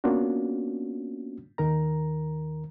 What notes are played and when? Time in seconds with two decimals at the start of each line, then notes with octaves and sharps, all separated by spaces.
0.04 A#3 B3 C#4 D4 F4 F#4
1.58 D#2 D#3 A#4 A#5